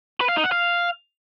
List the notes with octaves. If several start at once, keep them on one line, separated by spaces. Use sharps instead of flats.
B4
F5
D#4
F#5
F5